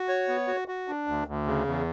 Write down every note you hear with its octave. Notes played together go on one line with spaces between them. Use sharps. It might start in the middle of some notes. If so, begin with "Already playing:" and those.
Already playing: F#4
C#5
B3
F#4
F#4
D4
D2
D2
C#3
E2